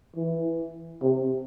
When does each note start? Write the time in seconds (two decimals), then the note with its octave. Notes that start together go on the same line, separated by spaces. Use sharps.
0.16 E3
1.02 C3